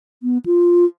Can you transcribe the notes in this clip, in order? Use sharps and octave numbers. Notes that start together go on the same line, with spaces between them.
B3
F4